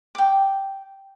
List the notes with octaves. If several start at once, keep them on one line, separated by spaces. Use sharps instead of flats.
G5 D6